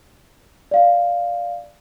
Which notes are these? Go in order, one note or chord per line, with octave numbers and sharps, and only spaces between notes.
D5 F5